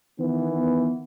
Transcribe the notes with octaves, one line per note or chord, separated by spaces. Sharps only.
D#3 E3 B3